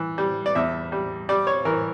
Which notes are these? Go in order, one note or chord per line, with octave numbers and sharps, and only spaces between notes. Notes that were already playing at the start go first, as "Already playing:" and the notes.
Already playing: E3
G3
D5
E2 E5
G3
G3 D5
C#5
E3 A#4